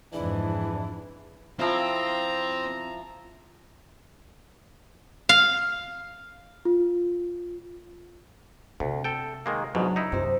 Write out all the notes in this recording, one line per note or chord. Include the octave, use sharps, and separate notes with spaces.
F2 G#2 E3 G#3 D4 E4
F3 C4 E4 F4 A#5
F5
F4
D2 C3
A4 G5
D#3 G#3 A#3
A1 G#2 B2 F#3 D4
D#4 E4
F#2 C3 C5